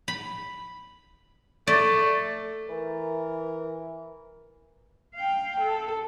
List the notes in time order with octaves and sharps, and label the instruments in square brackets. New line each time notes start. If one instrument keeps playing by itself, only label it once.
[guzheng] B5
[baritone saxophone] A3 [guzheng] D5
[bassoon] E3 [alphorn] A#4
[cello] F5 G5
A4